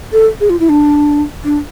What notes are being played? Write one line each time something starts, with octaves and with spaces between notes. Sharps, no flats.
A4
G#4
F4
E4
D4
D4